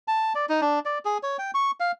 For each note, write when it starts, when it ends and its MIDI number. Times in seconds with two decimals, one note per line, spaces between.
0.08 0.33 81
0.35 0.46 74
0.49 0.61 63
0.61 0.79 62
0.85 0.98 74
1.05 1.18 68
1.23 1.37 73
1.39 1.51 79
1.54 1.71 85
1.80 1.91 77